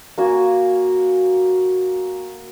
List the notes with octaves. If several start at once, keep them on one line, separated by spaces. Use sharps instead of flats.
A#3 F#4 G#5